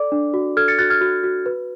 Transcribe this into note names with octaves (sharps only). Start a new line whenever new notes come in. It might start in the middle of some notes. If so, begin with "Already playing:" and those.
Already playing: A4 D5 D6
D4
F#4
A4 F6 G#6
A6 C#7
F#4 F#6 A6
F6 G#6
F#4
F#4
B4